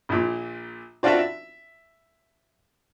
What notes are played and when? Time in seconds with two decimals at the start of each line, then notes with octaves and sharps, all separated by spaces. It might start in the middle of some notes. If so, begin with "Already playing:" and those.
0.09 A#1 A#2
1.03 C4 D4 F4 F#4 A4 E5
1.19 E5